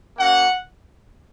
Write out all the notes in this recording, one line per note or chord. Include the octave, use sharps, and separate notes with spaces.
A#3 C#4 F#4 F#5